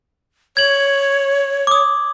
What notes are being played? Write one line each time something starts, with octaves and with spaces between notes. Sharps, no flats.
C#5 G#6 F#7
D6 D#6